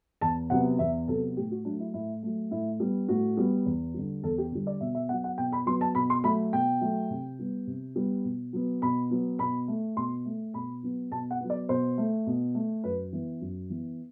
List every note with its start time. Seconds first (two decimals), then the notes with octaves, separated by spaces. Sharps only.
0.21 E2 A5
0.50 C3 F#3 B3 F#5
0.79 E2 E5
1.08 C3 F#3 B3 A4
1.37 A2 G4
1.51 F#4
1.65 F#3 A3 D4
1.80 E4
1.94 A2 E4
2.23 F#3 A3
2.51 A2 E4
2.80 G3 B3
3.09 A2 F#4
3.37 G3 B3
3.66 E2
3.94 D3 G3
4.23 E2 A4
4.38 G4
4.52 D3 G3
4.67 D5
4.81 B2 E5
4.95 E5
5.09 B3 F#5
5.13 F#3
5.24 F#5
5.38 B2 G5
5.53 B5
5.66 F#3 B3 C6
5.81 A5
5.95 B2 B5
6.10 C6
6.24 F#3 A3 B5
6.53 B2 G5
6.81 F#3 A3
7.10 C3
7.39 G3 B3
7.67 C3
7.96 G3 B3
8.25 B2
8.53 F#3 B3
8.82 B2 B5
9.11 F#3 B3
9.39 B2 B5
9.68 A3
9.97 B2 C6
10.25 A3
10.54 B2 B5
10.83 F#3 B3
11.11 B2 A5
11.31 F#5
11.41 F#3 B3
11.50 D5
11.69 B2 C5
11.98 A3
12.27 B2
12.55 A3
12.84 F#2 B4
13.12 E3 B3
13.41 F#2
13.70 E3 B3